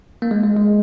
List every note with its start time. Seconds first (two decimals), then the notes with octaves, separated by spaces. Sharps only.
0.22 A#3
0.31 G#3
0.44 G#3
0.57 G#3